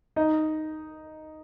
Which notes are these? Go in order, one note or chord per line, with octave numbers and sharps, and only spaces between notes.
D#4 D#5